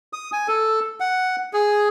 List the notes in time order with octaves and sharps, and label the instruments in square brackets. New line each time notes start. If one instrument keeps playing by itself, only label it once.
[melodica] D#6
G#5
A4
F#5
G#4